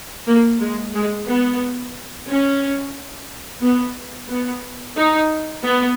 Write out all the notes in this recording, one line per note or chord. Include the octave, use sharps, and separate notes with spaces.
A#3
G#3
G#3
B3
C#4
B3
B3
D#4
B3